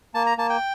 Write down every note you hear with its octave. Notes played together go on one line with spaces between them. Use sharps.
A#3 A5
A#5
A#3 A5
G5